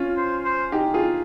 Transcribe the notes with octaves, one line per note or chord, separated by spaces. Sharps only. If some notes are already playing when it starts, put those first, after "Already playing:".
Already playing: C#4 F4
C5
C5
D#4 G4
F4 G#4